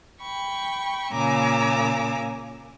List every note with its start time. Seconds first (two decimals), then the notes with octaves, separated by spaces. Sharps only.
0.20 G5 B5 C#6
1.13 A#2 C#3 G#5 A#5 D6 E6